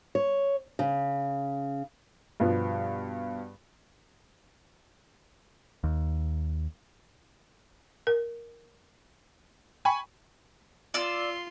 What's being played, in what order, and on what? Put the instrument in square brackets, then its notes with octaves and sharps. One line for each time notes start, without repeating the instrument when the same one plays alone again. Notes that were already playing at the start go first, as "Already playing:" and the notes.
[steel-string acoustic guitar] C#5
C#3
[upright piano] G2 B2 F3 B3
[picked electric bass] D#2
[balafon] A#4
[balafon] G5 [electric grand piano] G#5 B5 C#6
[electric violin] F4 C6 [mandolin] D5 E6